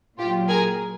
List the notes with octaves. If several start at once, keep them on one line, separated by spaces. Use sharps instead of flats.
A#2 F#3 F4 G4
G#4 A#4